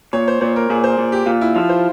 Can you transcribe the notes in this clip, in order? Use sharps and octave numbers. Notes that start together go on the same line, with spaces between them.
A#2 C#5
C5
A#2 C5
A#4
A#2 G#4
C5
A#2
G4
A#2 F4
E4
F3 F4
C5